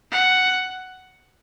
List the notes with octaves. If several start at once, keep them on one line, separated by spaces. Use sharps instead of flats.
F#5